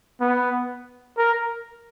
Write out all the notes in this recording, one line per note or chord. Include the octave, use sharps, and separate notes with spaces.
B3
A#4